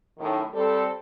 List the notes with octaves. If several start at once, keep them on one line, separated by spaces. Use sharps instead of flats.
F#2 A2 D#3
G3 C4 A4